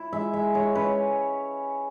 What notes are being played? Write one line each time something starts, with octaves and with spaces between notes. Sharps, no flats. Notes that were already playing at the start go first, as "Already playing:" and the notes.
Already playing: E4
G#3 E5
G#3 E5
G#3 C#5
C#4 B4